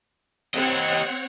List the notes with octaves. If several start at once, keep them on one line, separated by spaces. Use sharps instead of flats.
C4 G4 C#5 D#5 F#5